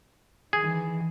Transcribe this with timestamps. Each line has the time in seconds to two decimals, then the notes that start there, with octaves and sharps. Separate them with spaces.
0.53 D#3 E3 G#4